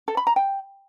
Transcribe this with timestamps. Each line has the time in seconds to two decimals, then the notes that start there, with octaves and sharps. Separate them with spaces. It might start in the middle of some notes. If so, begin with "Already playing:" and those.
0.08 A4
0.17 B5
0.27 A#5
0.36 G5